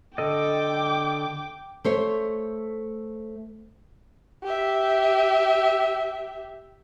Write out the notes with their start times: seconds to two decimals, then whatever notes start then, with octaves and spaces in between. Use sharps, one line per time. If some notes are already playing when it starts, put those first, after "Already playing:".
0.18 D3 A4 D#5 G5 D6
1.84 A3 C5 C#5
4.44 G4 E5